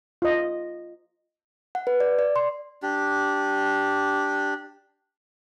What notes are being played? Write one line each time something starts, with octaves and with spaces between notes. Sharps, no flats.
F4 D#5
F#5
B4
D5
D5
C6
D4 G4